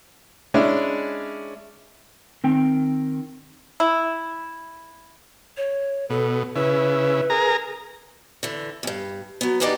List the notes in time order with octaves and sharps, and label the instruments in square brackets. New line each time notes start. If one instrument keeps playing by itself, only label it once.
[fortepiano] G#3 C#4 D4 E4 D5
[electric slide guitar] D#3 C4 G5
[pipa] E4
[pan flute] C#5
[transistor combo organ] B2 [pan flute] A4
[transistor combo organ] C#3 E4 [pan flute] B4
[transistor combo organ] G#4 A#4 A#5
[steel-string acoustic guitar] D3 E3
E2 G2
F#3 B3
E2 B3 D4 D#4 G4 D5